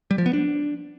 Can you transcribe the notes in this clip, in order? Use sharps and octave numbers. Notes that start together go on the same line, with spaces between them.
G3
F3
B3
D4